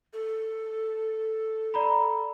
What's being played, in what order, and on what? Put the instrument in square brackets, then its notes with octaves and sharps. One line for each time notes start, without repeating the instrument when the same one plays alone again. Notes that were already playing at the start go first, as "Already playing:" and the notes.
[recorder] A4
[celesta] D5 A#5 B5